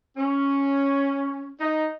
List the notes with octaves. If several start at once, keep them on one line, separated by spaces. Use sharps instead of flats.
C#4
D#4